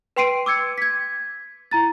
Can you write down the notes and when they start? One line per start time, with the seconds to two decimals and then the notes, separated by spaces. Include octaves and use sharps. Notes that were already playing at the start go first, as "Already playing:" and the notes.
0.16 B4 G5 C6 C7 D7 D#7
0.46 D6 E6 G#6 C#7
0.78 G#6 B6
1.71 E4 A#5 A6